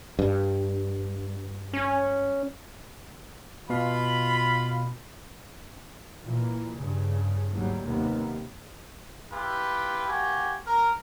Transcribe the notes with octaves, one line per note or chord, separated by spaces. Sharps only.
G2
C#4
B2 F4 B5
A#2 E3
G2 C#3
F#1 D2 G#2 F#3 G3
D#2 C3 B3
E4 F4 G4 B4
A#3 F#4 G4 G#5
A#4